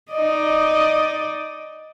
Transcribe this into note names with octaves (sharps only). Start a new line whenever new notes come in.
D#4 D5 D#5